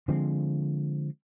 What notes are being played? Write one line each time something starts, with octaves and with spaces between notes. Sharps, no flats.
D3 F3 G#3 C4